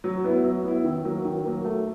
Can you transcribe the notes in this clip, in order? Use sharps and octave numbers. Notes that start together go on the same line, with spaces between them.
F#3
B3 E4
F#3
B3 E4
D#3
F#3 A#3
D#3
F#3 A#3
A3